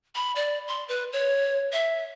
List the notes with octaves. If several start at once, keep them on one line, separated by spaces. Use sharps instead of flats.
B5
D5
C6
B4
C#5
E5